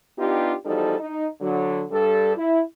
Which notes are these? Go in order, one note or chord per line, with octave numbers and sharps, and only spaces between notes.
B3 D4 D#4 F4 G4
E2 F3 G3 D#4 F#4 A4
D#4
D3 F#3
G2 G3 A4
E4